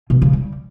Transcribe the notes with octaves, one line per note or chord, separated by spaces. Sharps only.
B2
C#3
G3